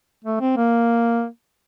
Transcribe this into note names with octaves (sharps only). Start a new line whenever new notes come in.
A3
C4
A#3